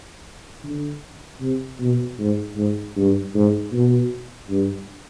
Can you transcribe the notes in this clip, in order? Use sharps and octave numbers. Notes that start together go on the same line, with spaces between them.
D3
C3
B2
G#2
G#2
G2
G#2
B2
G2